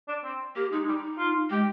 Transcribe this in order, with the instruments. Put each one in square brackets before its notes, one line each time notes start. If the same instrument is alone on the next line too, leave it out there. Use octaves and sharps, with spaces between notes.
[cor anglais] D4
C4
[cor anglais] A#3 [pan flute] G4
[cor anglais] G#3 [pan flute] D#4
[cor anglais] G#3
[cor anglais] G3 [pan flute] D#4
[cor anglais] F4
[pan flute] G#3 [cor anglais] G4